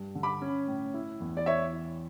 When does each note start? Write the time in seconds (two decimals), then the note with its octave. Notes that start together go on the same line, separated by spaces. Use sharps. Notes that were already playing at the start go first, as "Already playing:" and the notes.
Already playing: G2
0.15 D3
0.23 B5 D6
0.42 C#4
0.68 A2
0.94 E4
1.20 E2
1.37 D5
1.46 E4 C#5 E5
1.73 E4